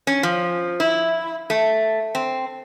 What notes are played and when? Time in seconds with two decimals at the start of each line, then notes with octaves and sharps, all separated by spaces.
0.07 C#4
0.23 F3
0.80 E4
1.50 A3
2.15 C4